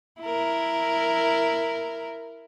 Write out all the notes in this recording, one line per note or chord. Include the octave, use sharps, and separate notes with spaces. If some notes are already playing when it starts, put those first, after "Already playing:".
E4 A#4